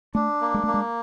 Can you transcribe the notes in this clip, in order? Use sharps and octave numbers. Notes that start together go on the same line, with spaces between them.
A3 D4
A#3
G#3
A3 A#3
G#3